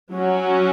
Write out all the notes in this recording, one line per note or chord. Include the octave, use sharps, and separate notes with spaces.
F#3 C#4 F#4